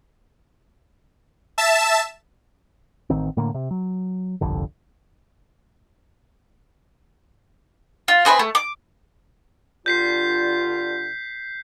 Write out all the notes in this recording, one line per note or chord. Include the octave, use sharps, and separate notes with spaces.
E5 A5 E7
A1 D#3 C4
A2 D3 A#3
C3
F#3
G1 C2 F2 D3
F4
C4 G#4 B4 E5
A3
D6
G2 D3 F4 G6 B6 C7